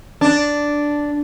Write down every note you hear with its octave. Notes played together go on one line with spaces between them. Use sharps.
D4